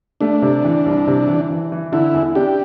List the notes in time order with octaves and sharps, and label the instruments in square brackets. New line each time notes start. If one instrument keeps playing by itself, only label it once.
[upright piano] A3 [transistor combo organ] D4
[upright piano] C3
E3
C2
C3
E3
E3
E3
[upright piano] D3 [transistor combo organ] E4
[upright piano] E2
[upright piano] D4 [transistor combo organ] G4